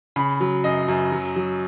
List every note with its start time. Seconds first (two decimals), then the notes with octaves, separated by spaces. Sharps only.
0.16 C#3 B5
0.40 F#3
0.64 F#2 D#5
0.88 F#2
1.12 F#3
1.36 F#3